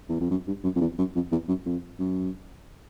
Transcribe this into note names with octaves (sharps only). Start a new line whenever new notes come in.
E2
F2
F#2
G2
F#2
F2
E2
F#2
F2
E2
F#2
F2
F#2